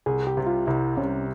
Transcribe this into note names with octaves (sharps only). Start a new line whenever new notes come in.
C2 G#4
G4
C3 G3
F4
C2 E4
C3 G3 C#4